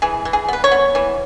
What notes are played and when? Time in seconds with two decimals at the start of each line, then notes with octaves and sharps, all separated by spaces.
0.02 E3 G#4
0.25 E3
0.33 G#4
0.48 B3 B4
0.64 C#5
0.71 B3
0.95 E3